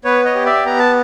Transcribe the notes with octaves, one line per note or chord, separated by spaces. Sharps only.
B3 B4 C#5
C#5 D#5
G4
D5 E5
B3 A#5
A5